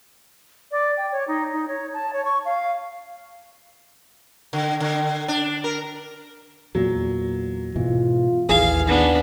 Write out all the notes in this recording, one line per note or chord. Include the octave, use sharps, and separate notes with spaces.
D5
G5
C#5
D#4
D#4
C#5
A5
C#5
C#6
F5
D3
D3
D4
A#4
E2 A#2 F#3
G#2 B2 E3 F4
A1 D#2 E3 G#4 F5
D#2 B3 D4 D#4